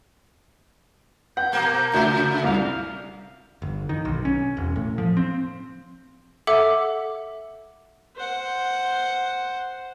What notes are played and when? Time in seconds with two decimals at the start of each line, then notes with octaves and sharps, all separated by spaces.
1.37 F#5 G6
1.52 B2 A#3
1.93 D2 C#3 F4 F#4 E5
2.44 C2 F5
3.62 G1
3.89 D#3
4.05 B1
4.25 C#4
4.57 E1
4.76 A2
4.98 F3
5.17 C4
6.47 A4 E5 F#5 D6
8.16 C5 F#5